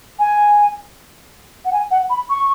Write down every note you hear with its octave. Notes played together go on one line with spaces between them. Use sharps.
G#5
F#5
G#5
F#5
B5
C#6